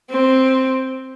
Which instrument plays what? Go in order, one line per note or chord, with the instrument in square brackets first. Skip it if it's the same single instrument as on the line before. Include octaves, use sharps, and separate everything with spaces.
[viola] C4